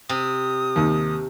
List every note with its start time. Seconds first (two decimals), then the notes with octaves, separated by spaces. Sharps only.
0.09 C3 D#6
0.76 D#2